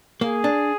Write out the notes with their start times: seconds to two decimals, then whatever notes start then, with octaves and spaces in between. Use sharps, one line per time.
0.21 A#3 G#4
0.44 D4